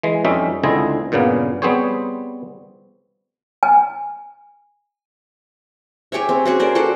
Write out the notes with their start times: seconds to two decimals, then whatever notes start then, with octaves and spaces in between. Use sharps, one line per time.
0.03 E3 G#3
0.25 F2 G3 C#4 D#4 E5
0.63 C#2 D3 C4 E4 D#5 G#5
1.12 G2 A#2 C#3 A#3 B3
1.62 G3 B3 C4 G#4 C5 C#5
3.63 G#5
6.12 G4 G#4 C#5 E5
6.29 C4
6.45 C#4 F#4 G#4
6.60 A#4 C5 D5
6.75 F#4 G4 A4 C5